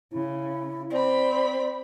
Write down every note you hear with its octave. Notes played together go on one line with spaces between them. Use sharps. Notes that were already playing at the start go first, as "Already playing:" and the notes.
C#3 E4
C4 D5 B5